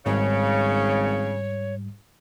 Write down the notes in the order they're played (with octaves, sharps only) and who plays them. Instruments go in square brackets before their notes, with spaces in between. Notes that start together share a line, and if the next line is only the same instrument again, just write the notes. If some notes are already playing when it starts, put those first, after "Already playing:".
[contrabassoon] G#1 [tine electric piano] G#2 G3 [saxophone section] C#3 [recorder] C#5